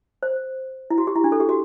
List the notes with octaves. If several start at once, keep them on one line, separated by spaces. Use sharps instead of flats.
C5
E4
F#4
G4
E4
D4
A4
G4
F#4